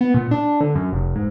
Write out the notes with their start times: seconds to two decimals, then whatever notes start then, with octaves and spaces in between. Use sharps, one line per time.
0.01 B3
0.14 A#2
0.31 D4
0.61 D3
0.75 F#2
0.93 F1
1.16 G#2